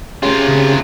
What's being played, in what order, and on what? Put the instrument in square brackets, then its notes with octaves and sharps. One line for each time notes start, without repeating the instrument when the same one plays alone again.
[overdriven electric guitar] C3 F4 [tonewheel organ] C#4 G4 G#4
[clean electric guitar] C#3